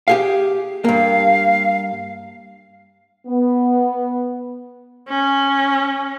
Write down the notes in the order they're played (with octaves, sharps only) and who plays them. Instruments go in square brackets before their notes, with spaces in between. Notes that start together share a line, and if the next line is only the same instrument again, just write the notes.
[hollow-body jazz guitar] G4 G#4 F5
[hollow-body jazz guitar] G2 A#3 [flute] F5
[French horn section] B3
[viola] C#4